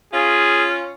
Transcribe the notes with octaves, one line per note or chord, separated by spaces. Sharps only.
C#4 F4 G#4